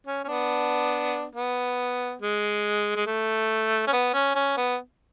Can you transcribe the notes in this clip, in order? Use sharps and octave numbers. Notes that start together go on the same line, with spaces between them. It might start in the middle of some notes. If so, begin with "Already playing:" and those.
C#4
C#4
B3 D4
B3
G#3
G#3
A3
C#4
B3
C#4
C#4
B3